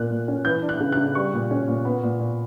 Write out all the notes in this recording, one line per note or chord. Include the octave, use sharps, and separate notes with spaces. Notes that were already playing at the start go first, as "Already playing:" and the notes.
Already playing: A#2 A#3 F#6
A#2
C#4
E3 G6
D4
F#6
C#3
C#3 F#6
G3 C#6
A#2
C#4
A#2
B3
A#2
A#2